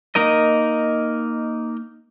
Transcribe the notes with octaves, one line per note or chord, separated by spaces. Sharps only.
A#3 D#4 A#4 D#5